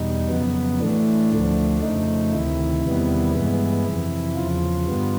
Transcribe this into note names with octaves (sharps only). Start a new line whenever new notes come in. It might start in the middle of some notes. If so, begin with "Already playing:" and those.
Already playing: E2 B2 G3 D#4
F2 C#3 F#3 B3
A2 E3 A3 D4
D2 D3 F3 A3
F2 C#3 F3 A3 D#4
D2 C3 D#3 E4
E2 C3 D#3 G3 B3
G2 E3 G#3 B3
F2 C3 E3
E2 C#3 F3 F4
G2 D3 G3 B3